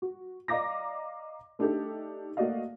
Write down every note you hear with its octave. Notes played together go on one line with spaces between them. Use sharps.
F#4
D5 D#5 F5 A#5 D6 A#6
A3 D4 D#4 G4 A4
A3 A#3 F#4 D5 D#5 F5